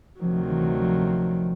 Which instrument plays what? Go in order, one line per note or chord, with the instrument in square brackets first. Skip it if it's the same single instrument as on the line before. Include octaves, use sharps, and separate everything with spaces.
[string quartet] D2 C3 D#3 F#3 [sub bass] F3
[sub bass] E3
F3